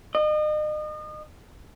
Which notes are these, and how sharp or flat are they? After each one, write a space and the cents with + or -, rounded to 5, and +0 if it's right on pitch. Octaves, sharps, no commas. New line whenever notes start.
D#5 -35